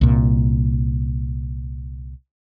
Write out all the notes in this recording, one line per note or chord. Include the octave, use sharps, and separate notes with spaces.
C2 A#2